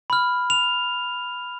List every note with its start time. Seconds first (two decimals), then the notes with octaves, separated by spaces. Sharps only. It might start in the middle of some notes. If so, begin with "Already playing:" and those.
0.10 B5 F6
0.50 F7